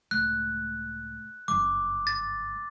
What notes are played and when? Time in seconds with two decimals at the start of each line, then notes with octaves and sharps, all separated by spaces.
0.11 C#2 A2 F#6
1.48 F#1 G2 D6
2.07 A6